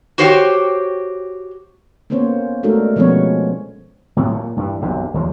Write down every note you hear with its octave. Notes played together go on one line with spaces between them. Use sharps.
F#4 G4 C5 C#5 D#5 G5
A#3 B3 C#4 C5 C#5
G#3 A3 D4 F#4 A4 A#4
B2 F3 G#3 B3 C#4 C#5
A2 C3 F#3
A#2
G2 E3
E1 B1 F#2 C3
D#2 F3 G#3